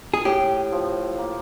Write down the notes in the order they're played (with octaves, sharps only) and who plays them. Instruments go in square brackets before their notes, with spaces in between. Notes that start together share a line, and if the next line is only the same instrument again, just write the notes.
[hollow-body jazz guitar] G#4
[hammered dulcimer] A2 [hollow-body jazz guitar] G4
[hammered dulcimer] F3
A#3